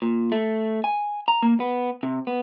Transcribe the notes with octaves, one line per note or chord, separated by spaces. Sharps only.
A#2
A3
G#5
A#5
A#3
B3
C3
B3